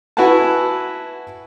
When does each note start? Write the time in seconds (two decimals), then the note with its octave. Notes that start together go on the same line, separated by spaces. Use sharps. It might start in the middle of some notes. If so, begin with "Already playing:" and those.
0.17 E4 F#4 B4 F#5 G#5 A5